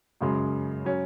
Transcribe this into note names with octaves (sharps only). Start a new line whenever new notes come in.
F#2 C#3 G#3
F#3 C#4